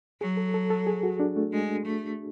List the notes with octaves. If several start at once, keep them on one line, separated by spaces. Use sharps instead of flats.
F#3 G#4
A4
A4
A4
G#4
F#4
D4
A3
G#3
A3